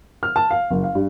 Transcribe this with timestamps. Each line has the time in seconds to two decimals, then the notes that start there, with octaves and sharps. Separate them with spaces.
0.23 F6
0.36 A5
0.51 F5
0.71 F#1
0.84 F5
0.95 G2